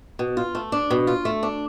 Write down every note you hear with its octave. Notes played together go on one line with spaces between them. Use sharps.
B2
F4
A3
D4
B2
F4
A3
D4